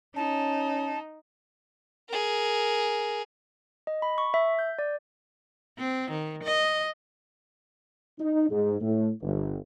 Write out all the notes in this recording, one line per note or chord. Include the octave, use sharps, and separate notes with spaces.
C#4 D#4 A5
G#4 A#4
D#5
B5
C#6
E5
G6
D5
C4
D#3
D#5
D#4
G#2
A2
G1